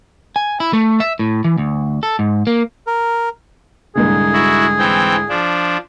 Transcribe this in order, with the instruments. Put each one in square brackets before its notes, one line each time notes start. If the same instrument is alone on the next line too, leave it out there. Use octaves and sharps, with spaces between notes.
[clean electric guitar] G#5
E4
A3
E5
A2
E3
D2
A4
G#2
A#3
[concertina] A#4
[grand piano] C2 G#2 D3 [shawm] G#4
[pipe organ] E4 F#4
E3 C4 G5
F3 D4